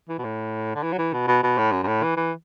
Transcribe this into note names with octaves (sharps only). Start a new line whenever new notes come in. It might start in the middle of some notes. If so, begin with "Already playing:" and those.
E3
B2
A2
D3
E3
F#3
E3
B2
B2
B2
A2
F#2
F#2
A2
E3
E3